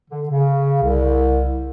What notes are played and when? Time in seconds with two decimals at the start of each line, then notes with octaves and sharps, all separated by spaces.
0.11 D3
0.29 C#3
0.83 C2